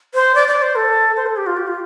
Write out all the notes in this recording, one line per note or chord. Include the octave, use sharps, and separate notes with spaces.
C5
D5
D5
C5
A4
C5
A4
G4
F4
G4
F4